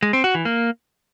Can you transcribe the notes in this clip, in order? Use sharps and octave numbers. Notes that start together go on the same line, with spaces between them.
G#3
C4
F#4
E3
A#3